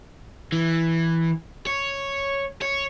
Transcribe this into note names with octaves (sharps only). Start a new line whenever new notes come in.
E3
C#5
C#5